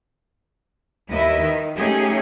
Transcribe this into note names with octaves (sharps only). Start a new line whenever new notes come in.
D#2 E4 B4 D#5 E5
D#3
A3 C#4 D#4 G4 G#4